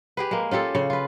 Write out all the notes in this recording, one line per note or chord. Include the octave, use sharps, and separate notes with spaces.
G4 G#4 B4
G#3 A#3
C#4 F4 G4 A4
C#3 C#5
F4 B4